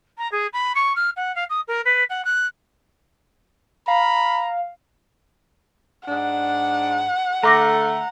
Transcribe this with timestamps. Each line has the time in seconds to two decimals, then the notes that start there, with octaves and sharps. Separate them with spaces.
0.18 A#5
0.32 G#4
0.53 B5
0.75 C#6
0.96 F6
1.16 F#5
1.35 F5
1.49 D#6
1.67 A#4
1.85 B4
2.09 F#5
2.24 F#6
3.88 F5 A#5 B5
6.08 G#2 D4 F#5
7.43 D3 A3 A#5 C6 D6 A#6